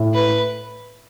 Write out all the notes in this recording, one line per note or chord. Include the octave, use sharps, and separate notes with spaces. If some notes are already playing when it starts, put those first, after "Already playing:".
Already playing: A2
B4